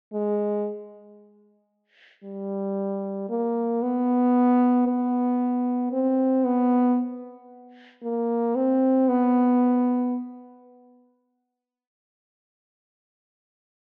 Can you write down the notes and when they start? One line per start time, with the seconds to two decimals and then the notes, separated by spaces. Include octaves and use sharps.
0.13 G#3
2.24 G3
3.29 A#3
3.82 B3
4.87 B3
5.92 C4
6.45 B3
8.03 A#3
8.55 C4
9.08 B3